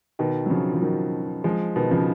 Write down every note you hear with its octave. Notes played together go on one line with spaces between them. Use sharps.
B2 D#3
F#3
C#3 F3
F3
D#3 F#3
F3 G#3
B2 D#3
C#3 F3